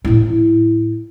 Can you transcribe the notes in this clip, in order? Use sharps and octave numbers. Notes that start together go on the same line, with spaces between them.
A2 E4